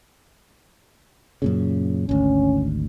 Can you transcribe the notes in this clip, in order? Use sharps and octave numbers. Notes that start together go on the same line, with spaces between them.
F#2 A#2 C#3
G#1 D2 C#4